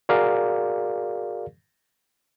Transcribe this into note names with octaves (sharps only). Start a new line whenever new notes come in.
F#4 G#4 A#4 D5 F5